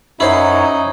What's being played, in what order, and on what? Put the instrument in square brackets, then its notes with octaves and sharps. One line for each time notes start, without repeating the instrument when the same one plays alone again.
[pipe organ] F#2 C#5 [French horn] D#4 [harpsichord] E4 C5